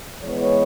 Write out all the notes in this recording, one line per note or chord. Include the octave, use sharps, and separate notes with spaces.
E3 G#3 B3 C#5